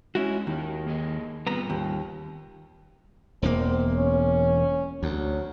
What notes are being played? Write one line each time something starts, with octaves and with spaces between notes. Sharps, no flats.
G#3 A3 C#4 E4 F#4
D#2 D#4 A#4
A#3 G#4 D#5
G3 B3 C4 F4 A#5
D#2
E1 E2 A#3 C4
C#4
D2 F#3